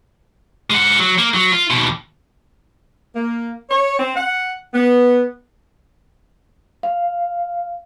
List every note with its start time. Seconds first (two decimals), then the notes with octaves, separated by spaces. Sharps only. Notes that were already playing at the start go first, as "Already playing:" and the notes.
0.70 G#3 F#5
0.99 F#3
1.18 A#3
1.34 F#3
1.52 F4
1.70 D#2 B2
3.16 A#3
3.69 C#5
3.99 C4
4.16 F#5
4.74 B3
6.83 F5